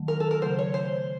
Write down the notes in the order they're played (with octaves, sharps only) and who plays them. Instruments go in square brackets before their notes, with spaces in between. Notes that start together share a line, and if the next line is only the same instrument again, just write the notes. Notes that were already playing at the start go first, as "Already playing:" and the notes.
Already playing: [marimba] D#3 F#3 A3
[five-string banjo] A#4
A4
A#4
[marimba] C#3 F#3 A3 [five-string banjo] C5
[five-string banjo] C#5
C5